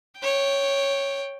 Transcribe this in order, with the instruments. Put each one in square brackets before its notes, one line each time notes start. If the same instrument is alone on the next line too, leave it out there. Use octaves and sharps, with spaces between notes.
[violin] C#5 G5